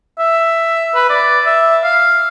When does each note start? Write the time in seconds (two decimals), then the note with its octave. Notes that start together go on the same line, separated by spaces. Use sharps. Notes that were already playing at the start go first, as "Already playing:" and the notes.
0.19 E5
0.95 B4
1.10 D5
1.46 E5
1.83 F5